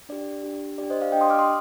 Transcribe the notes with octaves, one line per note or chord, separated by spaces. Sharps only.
D4 G4 D5
D4 G4
D4 G4 D5
C5 D#5
D5 F5
D4 G4 D#5 G5
C6 D#6
D6 F6
C6 D#6